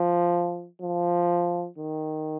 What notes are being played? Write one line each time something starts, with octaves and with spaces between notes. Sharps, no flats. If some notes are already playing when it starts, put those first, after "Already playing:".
Already playing: F3
F3
D#3